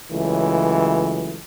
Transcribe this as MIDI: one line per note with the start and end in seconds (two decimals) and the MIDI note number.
0.11 1.38 37
0.11 1.38 52
0.11 1.38 54
0.11 1.38 57